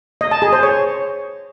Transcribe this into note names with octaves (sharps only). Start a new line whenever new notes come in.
D#5
A5
G#4
C5
C#5